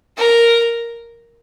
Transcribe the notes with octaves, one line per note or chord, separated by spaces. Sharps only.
A#4